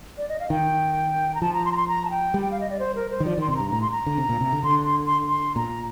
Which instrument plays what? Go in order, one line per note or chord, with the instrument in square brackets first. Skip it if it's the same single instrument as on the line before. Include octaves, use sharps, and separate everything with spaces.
[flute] D5
D#5
F5
[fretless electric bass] D#3 [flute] G5
[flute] A#5
[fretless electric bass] F3 [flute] A5
[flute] A#5
C6
A#5
C6
A#5
A5
G5
[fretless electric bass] G3
[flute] G5
F5
D#5
D5
C5
A#4
C5
[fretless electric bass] D#3
[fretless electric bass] F3 [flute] D5
[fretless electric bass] D#3 [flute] C6
[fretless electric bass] C3 [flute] C6
[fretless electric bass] G2 [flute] A#5
[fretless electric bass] A2 [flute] A#5
[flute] C6
A#5
[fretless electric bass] D3
C3
A#2
C3
D3
[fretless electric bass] D3 [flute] C6
[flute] C6
C6
C6
[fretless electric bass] A#2 [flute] A#5